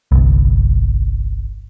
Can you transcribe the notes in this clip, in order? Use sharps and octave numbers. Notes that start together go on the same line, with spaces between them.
G1 C2